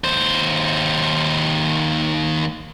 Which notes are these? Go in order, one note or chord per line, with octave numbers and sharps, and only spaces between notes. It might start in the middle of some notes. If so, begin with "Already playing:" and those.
D#2 C5